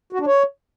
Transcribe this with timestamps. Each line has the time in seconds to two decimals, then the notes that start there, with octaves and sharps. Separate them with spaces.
0.13 F#4
0.20 D4
0.27 C#5